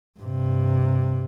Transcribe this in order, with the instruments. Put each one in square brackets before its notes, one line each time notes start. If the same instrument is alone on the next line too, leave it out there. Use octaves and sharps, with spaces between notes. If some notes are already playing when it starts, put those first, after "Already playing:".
[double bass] G2 C3